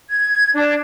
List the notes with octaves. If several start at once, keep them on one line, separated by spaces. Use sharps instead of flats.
G#6
D4